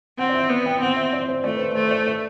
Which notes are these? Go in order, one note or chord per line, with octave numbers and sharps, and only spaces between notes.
C4 F#5
D5
E5
B3
G5
C4 F#5
E5
D5
C5
A3 D5
B4
C5
A3 C5
C5
D5
D5